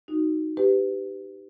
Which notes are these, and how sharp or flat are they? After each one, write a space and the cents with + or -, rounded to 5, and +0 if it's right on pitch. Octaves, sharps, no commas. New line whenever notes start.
D#4 +0 F#4 +0
G4 +0 B4 +25